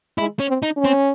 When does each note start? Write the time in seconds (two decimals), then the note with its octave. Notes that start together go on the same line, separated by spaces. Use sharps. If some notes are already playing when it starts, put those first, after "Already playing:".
0.18 G#3 E4
0.39 C#4
0.48 C4
0.63 D#4
0.77 C#4
0.85 C4